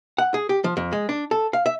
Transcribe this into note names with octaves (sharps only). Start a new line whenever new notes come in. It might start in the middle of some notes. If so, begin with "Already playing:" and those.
F#5
G#4
G4
F3
F2
G#3
D4
A4
F5
E5